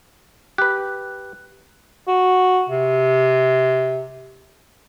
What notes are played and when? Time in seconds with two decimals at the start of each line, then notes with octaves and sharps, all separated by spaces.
0.58 G4 B4 F#6
2.08 F#4
2.69 C3